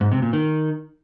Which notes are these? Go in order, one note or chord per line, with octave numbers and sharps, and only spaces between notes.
G#2
C3
A#2
D#3